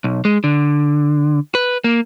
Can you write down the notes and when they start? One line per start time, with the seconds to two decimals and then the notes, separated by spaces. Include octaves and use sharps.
0.04 B1
0.25 G#3
0.44 D3
1.55 B4
1.84 A#3